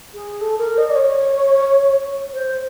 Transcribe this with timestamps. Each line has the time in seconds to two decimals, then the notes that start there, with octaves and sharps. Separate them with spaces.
0.14 G#4
0.40 A4
0.58 A#4
0.77 D#5
0.89 D5
0.95 C#5
2.33 C5